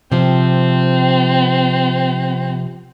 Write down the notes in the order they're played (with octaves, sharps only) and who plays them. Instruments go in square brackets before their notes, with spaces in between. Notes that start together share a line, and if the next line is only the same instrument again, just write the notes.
[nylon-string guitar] C3 F3 [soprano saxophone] C4